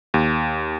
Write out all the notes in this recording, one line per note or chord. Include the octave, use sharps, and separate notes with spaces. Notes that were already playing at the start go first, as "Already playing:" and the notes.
D#2